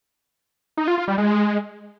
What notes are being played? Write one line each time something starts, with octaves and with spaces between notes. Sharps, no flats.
D#4
F4
F4
G3
G#3